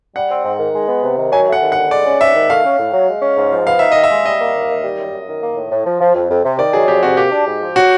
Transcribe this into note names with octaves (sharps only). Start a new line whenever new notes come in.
G3 F#5
C4
G#2
D#3
G#3
B3
C3
D#3
F#3 G#5
A3 F#5
D#2
F#5
D3
G#3 D5
C#4
G#2 E5
D#3
A3 F5
C#4
A2
F#3
G#3
C#4
G#2
F3
B3 F5
D#4 E5
D#3 D#5
E5
G#3
G3 D#5
A#3
D#2
D#3
G3
F#2
F#2
D#3
A#3
A2
A2
F3
F3
F2
F2
C3
D#3 D5
F#3 G#4
F2 G4
C3 F#4
A#3 G4
D4
G#2
F3
F#3 F#4